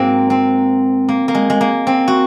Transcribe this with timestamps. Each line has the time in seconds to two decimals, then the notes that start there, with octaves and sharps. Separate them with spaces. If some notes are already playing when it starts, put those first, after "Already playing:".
Already playing: G#2 F#3 A#3 C4
0.30 C4
1.09 A#3
1.28 A#3
1.35 G#3
1.50 G#3
1.61 A#3
1.87 C4
2.08 F#4